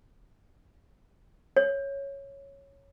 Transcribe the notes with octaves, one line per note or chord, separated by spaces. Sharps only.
C#5